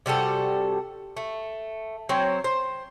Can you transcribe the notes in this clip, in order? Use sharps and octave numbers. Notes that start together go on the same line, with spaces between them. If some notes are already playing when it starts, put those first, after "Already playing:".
C3 G3 F#4 A4
A3
F#3 C4 C5 C#5
C5